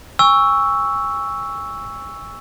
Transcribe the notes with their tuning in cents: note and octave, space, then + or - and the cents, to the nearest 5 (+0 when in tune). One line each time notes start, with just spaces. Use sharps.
G#5 -35 C#6 +5 E6 +0